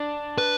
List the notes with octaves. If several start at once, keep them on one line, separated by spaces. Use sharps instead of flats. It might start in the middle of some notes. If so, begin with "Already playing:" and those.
Already playing: D4
B4